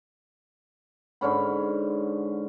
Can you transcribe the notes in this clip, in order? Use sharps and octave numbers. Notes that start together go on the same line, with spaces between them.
G#2 D3 C#4 B5